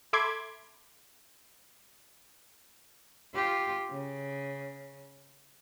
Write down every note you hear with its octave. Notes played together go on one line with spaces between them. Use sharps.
A4 E5 B5 C6 D6 G#6
F4 G4
C#3